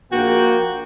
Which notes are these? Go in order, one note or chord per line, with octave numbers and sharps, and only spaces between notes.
A#1 A#3 F#4 G5